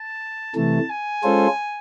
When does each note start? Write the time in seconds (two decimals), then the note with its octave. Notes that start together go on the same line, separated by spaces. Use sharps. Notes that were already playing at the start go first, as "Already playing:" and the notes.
Already playing: A5
0.56 C3 E3 A3 A5
0.90 G#5
1.24 G#3 C#4 F4 A4 C5